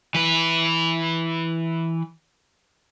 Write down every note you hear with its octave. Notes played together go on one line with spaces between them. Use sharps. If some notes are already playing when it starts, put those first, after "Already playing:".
E3 B4